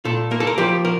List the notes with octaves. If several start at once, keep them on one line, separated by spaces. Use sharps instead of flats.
A#2 A4
A#3 A#4
A4
A#4
F3 G4
A#4